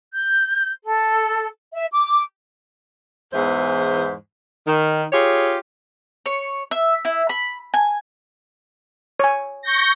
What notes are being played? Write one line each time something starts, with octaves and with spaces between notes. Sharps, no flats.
G6
A4
E5
D6
E2 G#2 E3 C5
D#3
F4 G4 G#4 C#5
C#5
E5
E4
B5
G#5
C#5 G#5
C#6 G6 A#6